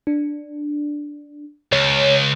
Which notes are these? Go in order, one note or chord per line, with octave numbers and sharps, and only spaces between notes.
D4
C#2 C#5